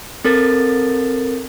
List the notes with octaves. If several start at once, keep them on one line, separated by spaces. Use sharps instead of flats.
C4 A4 A#4 A6